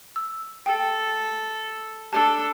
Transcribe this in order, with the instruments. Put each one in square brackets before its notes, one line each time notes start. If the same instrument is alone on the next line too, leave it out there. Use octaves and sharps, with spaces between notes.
[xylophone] E6
[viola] A4 [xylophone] G5
[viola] D4 A4 [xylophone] A5